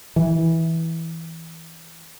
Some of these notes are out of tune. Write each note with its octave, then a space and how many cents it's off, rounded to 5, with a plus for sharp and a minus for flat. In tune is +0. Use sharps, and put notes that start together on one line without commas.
E3 -10